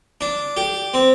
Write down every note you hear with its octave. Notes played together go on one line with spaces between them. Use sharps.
D4
G4
C4